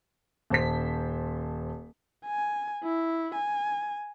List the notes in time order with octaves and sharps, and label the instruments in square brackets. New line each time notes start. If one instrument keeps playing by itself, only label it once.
[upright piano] D#1 C5 A5 B6
[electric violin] G#5
E4
G#5